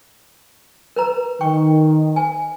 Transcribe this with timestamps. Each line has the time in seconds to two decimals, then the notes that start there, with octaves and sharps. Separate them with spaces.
0.96 A#4 B4 A#5
1.41 D#3 G5 C#6
2.16 G#5